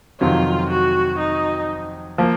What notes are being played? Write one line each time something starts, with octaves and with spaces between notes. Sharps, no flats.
F2 C3 D#3 F#3 F4
F#4
D#4
F3 A#3